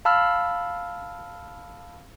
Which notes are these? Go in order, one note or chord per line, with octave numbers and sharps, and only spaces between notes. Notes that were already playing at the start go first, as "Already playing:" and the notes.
F5 A5 B5 E6 F6